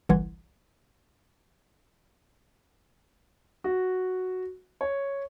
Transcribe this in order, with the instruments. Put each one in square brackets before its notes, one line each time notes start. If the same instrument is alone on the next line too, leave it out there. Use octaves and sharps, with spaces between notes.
[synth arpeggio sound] G1 C2 E3 F#5 C6 G#6
[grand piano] F#4
C#5